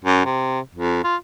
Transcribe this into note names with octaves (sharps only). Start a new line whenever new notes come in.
F#2
C3
F2
F4